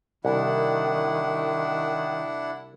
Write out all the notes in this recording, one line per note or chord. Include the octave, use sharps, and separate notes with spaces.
C2 D#3 D4 E4 F#5